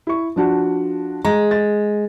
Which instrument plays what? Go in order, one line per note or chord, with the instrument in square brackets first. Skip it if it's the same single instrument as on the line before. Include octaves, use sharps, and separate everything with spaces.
[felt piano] E4 C#6
F3 D4 F#4
[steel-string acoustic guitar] G#3 [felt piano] A#5
[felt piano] A6